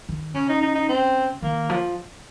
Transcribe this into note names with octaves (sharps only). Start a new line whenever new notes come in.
D#3
C#3 C#4
D#4
D#4
D#4
C4
D#3 A#3
F3